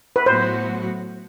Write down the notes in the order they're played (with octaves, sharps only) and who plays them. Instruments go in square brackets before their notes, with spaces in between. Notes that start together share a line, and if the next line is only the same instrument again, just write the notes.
[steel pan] B4
[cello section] A2 F#3 B3 F#4 [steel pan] C5